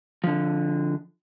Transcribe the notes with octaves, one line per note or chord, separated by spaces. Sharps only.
D3 F3